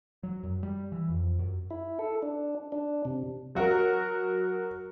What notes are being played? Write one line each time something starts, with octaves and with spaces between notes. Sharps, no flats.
F#3
F#2
G3
E3
F2
F#2
E4
A4
D4
D4
C3
F#3 F#4 A#4